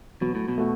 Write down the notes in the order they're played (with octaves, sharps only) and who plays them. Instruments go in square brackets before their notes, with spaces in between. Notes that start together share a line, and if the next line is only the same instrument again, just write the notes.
[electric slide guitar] B2 [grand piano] F#3
[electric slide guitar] A2
B2
[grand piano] A3 F#4